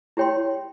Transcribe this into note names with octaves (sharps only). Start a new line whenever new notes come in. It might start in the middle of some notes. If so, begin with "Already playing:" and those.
E4 G4 C#5 G5 C6